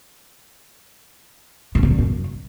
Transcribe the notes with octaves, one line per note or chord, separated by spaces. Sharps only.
A2
C#3
A#2
F#2